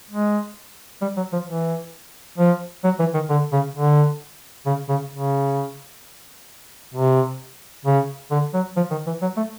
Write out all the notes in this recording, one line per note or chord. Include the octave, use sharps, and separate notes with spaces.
G#3
G3
F#3
F3
E3
F3
F#3
E3
D#3
D3
C#3
D3
C#3
C#3
C#3
C3
C#3
D3
F#3
F3
D#3
E3
F#3
A3